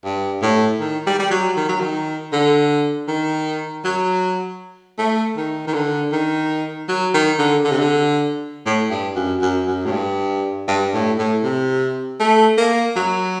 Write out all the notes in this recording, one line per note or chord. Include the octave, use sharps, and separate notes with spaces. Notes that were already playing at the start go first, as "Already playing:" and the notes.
G2
A2
D#3
G3
G3
F#3
D#3
F#3
D#3
D3
D#3
F#3
A3
D#3
D#3
D3
D#3
F#3
D#3
D3
D3
C3
D3
A2
G2
F#2
F#2
F#2
A2
G2
G2
A2
A2
C3
A3
A#3
F#3